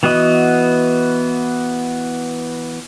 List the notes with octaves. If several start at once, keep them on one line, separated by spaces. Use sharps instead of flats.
E3 B3 F#4 D#5